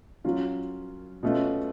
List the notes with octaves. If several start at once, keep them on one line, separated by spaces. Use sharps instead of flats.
F#3 C#4 F4
B2 A3 C#4 F4